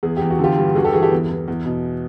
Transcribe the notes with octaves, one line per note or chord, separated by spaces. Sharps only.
E2 G#4
E2 G4
F#4
D3 F4 G4
G2
G2 F#4 G#4
G4 A4
E3 F#4 G#4
G4 A4
E2
E2
E2
B2